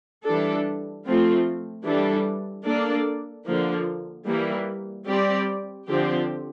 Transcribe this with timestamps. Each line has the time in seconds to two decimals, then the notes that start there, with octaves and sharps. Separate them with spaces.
0.24 E3 G3 D4 A4
1.04 F3 A3 C4 F4
1.85 E3 G3 D4 A4
2.65 A#3 D4 A4 D5
3.46 D3 F3 A#3
4.26 E3 G3 A#3
5.06 G3 C4 G4 D5
5.86 D3 F3 C4 G4